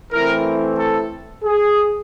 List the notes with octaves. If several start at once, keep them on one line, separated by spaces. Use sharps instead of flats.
E3 A3 C4 E4 A#4
A4
G#4